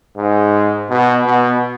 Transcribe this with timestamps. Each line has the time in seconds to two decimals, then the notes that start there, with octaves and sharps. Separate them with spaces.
0.17 G#2
0.90 B2
1.26 B2